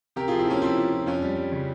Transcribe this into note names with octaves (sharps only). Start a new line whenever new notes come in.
C3 G4 A#4
F3 F4 G#4
C4 E4
F3 A#3 C#4
F3 C4 E4
F3
F3
F2 C#4 F4
G3
G3
C#3